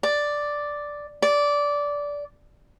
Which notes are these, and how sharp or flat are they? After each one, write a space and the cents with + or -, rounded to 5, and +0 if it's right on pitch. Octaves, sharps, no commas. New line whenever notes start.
D5 +0
D5 -15